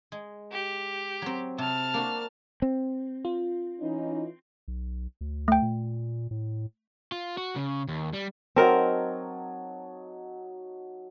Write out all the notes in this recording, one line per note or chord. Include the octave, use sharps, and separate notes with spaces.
G#3
G4
F#3 C4
C3 A5 F6
A#3 D4 F#4
C4
F4
E3 C#4 D#4
B1
D2
A3 G5
A#2
A2
F4
F#4
C#3
D#2
G3
F#3 C4 D#4 A#4 A5